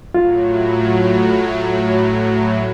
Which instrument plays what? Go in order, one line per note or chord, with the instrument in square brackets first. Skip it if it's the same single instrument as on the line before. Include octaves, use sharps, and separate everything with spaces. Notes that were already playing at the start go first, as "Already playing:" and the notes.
[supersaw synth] A2 F#3 [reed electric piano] F4